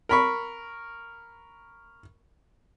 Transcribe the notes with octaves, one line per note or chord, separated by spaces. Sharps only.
A#4 B5 C#6